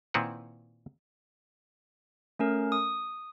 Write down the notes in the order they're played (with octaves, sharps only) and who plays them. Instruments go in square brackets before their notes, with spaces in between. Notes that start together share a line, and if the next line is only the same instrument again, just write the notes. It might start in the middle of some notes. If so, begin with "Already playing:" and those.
[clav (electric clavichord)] A#2 D#3 C4 E4 B4 F#5
[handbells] A3 C#4 A#4
D#6